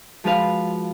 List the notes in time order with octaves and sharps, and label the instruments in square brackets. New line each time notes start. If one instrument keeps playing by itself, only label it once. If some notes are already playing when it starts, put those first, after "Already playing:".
[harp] F3 G#3 F4 F#4 B4 F5